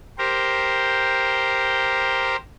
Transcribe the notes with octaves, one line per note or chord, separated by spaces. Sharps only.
G4 A#4 C5